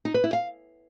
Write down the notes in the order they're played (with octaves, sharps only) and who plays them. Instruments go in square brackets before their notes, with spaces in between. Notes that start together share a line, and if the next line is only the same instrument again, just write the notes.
[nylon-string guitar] D#4
B4
E4
F5